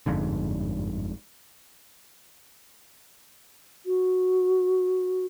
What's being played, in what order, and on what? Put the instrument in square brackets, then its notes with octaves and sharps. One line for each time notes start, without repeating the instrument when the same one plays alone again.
[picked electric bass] G1 F2 G#2 D3
[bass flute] F#4